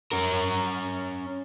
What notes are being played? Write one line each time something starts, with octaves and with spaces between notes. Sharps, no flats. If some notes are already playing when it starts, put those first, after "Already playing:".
C#4 A#4